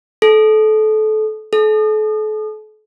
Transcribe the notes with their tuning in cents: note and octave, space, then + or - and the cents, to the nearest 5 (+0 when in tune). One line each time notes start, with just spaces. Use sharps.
A4 -25
A4 -40